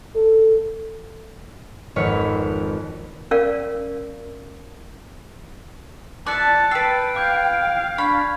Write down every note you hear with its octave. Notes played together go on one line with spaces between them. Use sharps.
A4
G#1 F2 B4 C#5 F6 C#7
C#4 A#4 D5 F5
D5 E5 A5 D6 F#6 C#7
B4 G5 E6 C7
F5 D6 G6 G#6
D4 B5 C#6 G#6